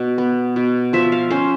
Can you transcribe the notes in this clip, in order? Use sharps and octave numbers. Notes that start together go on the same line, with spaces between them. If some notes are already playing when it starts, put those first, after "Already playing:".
Already playing: B2
B3
B2
F3 E5
F5
C#4 C5